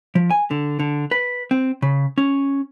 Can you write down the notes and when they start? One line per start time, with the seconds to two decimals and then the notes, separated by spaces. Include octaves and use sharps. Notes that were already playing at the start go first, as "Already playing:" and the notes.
0.15 F3
0.31 G#5
0.51 D3
0.80 D3
1.11 B4
1.51 C4
1.82 C#3
2.18 C#4